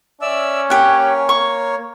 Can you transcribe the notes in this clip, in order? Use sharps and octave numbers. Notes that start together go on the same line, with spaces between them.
C#4 D5 E5 E6
A#3 G4 C#5 F#5
C#6